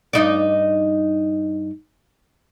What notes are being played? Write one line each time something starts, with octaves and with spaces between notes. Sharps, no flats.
G2 D#4 D5